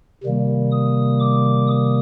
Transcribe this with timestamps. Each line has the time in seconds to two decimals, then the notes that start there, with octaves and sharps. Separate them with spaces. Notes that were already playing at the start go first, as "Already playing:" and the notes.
0.24 C3 D#3 G3 A#3
0.72 D#6
1.20 D6
1.67 D#6